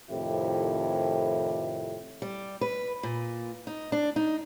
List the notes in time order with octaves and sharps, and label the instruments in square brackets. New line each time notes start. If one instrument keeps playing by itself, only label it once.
[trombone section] F2 A2 C3 D#3 E4 G4
[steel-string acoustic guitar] G3
B4
A#2
D#4
D4
D#4